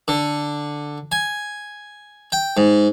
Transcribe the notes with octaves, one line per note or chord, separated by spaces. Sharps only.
D3
G#5
G5
G#2